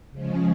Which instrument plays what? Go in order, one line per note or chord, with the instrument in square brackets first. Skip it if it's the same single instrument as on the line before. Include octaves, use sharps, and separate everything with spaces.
[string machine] C#3 F3 G#3 C#4